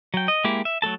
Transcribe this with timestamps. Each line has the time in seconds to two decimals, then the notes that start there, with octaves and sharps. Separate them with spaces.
0.14 F#3 G5
0.28 D#5
0.44 G#3 A#3 E4 G4
0.65 E5
0.82 F#3 A3 A4 A5